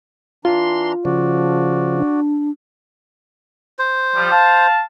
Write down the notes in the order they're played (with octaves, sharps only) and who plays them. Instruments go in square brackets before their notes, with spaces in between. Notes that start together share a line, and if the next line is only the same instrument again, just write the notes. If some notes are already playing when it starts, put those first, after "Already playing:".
[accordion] E3 D4 A#5 [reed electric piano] F4 [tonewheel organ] C6
[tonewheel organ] C#3 F3 [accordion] F#4 D5
[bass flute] D4
[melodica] C5
[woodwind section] F3 G3
F5 A5